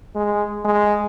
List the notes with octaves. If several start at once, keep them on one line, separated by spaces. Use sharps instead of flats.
G#3
G#3